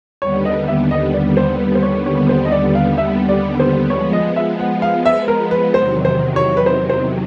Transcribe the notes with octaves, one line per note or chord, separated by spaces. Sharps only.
D#2 D3 G3 B3 C#5
D#5
E5
D#5
D5
C5
B4
C5
C#5
D#2 D3 G3 B3 C#5
C5
D#5
D5
F5
E5
D5
C5
F3 G#3 B3 C#5
D#5
E5
F#5
F5
E5
A#4
B4
E2 C3 D#3 F#3 C5
C5
C#5
B4
C5
C5